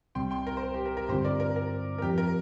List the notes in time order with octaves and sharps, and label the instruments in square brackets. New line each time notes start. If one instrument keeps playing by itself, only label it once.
[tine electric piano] C2 C3 G3 C4 [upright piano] G5 C6
[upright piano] G5 C6
A#4
C5
A#4
G4
A#4
A#4
[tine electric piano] G2 D3 G3 C4 F4 [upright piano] G4 C5
[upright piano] A#4 D5
A#4
A#4
A#4
[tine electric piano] F2 F3 C4 F4 [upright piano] G4
[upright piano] A#4